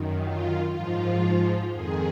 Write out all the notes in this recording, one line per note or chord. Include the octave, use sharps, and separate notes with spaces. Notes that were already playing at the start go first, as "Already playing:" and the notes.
Already playing: F#2 D#3
F4
G#2 F3 F4
F2 D#3 G#4